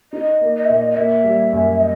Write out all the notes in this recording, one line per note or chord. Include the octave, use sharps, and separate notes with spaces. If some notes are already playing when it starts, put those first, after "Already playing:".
D#4 D#5
A#3
D#5
E5
A#2 D#5
D#5
A#3 E5
G3
F#2
D#5